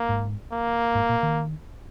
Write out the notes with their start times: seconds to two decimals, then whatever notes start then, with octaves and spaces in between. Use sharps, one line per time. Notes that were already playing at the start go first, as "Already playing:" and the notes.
Already playing: A#3
0.09 G#2
0.52 A#3
0.95 G#2
1.09 A#2
1.23 D#3